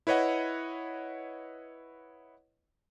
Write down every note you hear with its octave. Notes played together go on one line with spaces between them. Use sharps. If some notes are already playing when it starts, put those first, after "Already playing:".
E4 B4 C#5 D#5 F#5